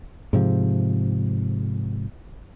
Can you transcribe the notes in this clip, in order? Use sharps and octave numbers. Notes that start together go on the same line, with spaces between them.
G#2 C3 F3